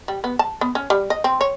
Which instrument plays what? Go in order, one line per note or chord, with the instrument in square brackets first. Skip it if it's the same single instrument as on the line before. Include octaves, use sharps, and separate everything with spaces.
[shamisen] G3
B3
A5
B3
C#4
G3
D#5
C4
C#5